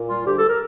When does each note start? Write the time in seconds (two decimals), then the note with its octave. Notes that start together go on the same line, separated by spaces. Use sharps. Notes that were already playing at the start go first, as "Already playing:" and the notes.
Already playing: A#2
0.09 G3 F4
0.26 D2 G4
0.38 A4
0.49 A#4